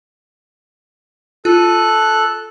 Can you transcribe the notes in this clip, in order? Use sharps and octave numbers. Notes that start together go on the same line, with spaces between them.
F4 A4 F#6